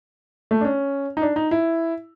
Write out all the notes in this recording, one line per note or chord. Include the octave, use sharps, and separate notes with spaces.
A3
D4
C#4
D#4
D4
D#4
E4